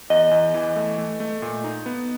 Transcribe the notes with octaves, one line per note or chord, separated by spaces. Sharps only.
E2 D#5
E2
E3
A3
A3
A3
A#2
D#4
B3